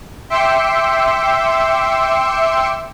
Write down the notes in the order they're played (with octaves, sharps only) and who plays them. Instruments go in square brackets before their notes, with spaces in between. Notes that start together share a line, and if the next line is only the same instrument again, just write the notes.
[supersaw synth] E5 G5 C6 D6 E6 C#7